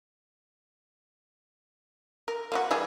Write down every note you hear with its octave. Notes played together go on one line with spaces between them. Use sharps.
A#4
A#3 F4 F#4
E3 G3 G#4